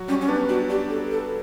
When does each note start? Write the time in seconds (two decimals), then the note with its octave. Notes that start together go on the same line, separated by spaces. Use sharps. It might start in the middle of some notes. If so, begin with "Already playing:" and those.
Already playing: F#3 F#4
0.08 G3 C#4 G4
0.21 C#4
0.28 B3 D4 B4
0.49 D4 F#4 D5
0.70 D4 G4 D5
0.90 A4
1.11 A4